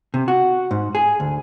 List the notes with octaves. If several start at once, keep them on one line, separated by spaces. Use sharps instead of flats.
C3
F#4
G#2
G#4
D2